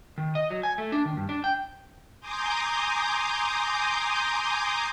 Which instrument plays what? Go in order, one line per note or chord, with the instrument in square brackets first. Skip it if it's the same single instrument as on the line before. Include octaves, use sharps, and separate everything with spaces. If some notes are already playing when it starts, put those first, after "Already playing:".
[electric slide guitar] D#3
D#5
F#3
G#5
A3
D4
D#3
G2
D4
G5
[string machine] G#5 A#5 C6 D6 D#6 G6